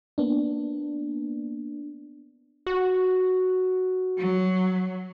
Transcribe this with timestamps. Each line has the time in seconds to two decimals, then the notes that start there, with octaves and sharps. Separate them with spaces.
0.18 A#3 B3 D4
2.67 F#4
4.18 F#3